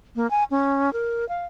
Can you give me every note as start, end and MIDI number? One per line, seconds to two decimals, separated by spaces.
0.16 0.29 58
0.31 0.44 80
0.51 0.93 61
0.93 1.27 70
1.29 1.46 77